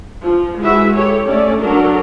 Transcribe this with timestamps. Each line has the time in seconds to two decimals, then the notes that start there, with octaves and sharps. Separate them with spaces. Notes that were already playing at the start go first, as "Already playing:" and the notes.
0.22 F3
0.60 G#3 E4 F#4 B4 E5
0.93 G4 A4 C#5
1.27 A3 C#4 A4 D5
1.59 F#3 D4 A4 A#4